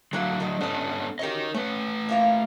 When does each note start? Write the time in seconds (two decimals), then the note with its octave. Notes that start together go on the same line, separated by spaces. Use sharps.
0.13 D3 F#3 A#3 F#5
0.40 D#3 D#5
0.61 B3 C#4 D4 A4 D#5
1.19 C#4 F#4 G4 A#4 D#5
1.54 A3 C#4 B4
2.09 A#3 E4 F4